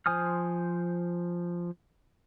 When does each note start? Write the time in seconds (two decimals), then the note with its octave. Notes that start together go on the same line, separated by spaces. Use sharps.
0.06 F3 C5 G#5 D#6 F6